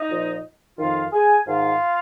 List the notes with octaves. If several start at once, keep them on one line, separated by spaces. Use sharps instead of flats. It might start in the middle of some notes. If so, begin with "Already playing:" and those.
Already playing: D#4 D#5
A#2 F3
F2 D#3 F4 F5
G#4 G#5
G#2 D#3 F4 F5